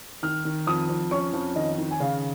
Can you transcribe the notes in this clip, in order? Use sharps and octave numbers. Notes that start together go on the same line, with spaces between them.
D#3 F6
D#3
F2 D#6
F2
C#4 C#6
F2
D#3 D#5
D#3
G#5
C#3 F5